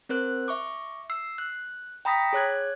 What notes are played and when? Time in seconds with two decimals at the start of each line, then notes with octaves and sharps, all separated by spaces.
0.09 C4 A#4 C5 F#6
0.48 E5 C#6 D6
1.10 E6 C7
1.38 F#6
2.05 G5 A#5 B5 D#6 A#6 B6
2.33 G#4 C#5 F#6 G#6